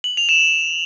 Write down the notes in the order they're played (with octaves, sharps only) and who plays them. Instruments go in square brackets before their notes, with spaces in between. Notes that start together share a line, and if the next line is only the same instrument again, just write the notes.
[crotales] F#7
F7
E7